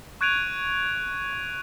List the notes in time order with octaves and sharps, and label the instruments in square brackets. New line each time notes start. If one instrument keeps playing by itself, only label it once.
[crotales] C#6 F#6 G#6 D7 D#7 F7